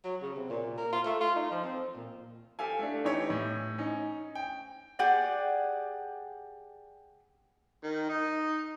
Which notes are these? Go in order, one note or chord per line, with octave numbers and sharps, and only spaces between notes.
F#3
C#3
C3
A#2
A#4
F4
A3
F4
D#4
F3
C4
A#2
G4 A4 F5 G#5
A3 D4
E3 C#4 D#4 E4 G4 C#5
A2
C#4 D#4
G5
G4 G#4 D5 F#5
D#3
D#4